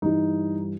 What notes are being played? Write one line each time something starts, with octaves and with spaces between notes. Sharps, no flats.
G2 E3 G3 D#4